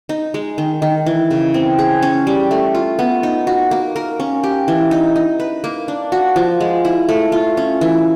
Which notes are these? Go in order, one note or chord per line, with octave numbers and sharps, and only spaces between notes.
D#4
G#3
D#3
D#3
E3
C#3
C4
G#4
C#4
G3
A3
F4
B3
D#4
F#4
A#3
A#4
C#4
G4
E3
D#4
D#4
B4
A#3
D4
F#4
F3
G#3
E4
A3
F4
C#4
E3